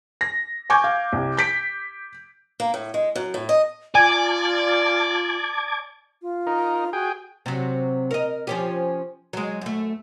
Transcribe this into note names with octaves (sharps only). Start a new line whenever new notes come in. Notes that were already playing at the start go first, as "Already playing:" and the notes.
A#6
G#5 C#6 D6 G6 G#6
F5
C2
G6 B6 D7
A#3
A2
G#3
F#2
A2
D#5
F4 D5 G#5 A5 D6 G#6
F4
D#4 A#4
F#4 G#4 G5
C3 F#3
A#4 D#5
F3 C#4 G4
F#3 G#3
F#2 A3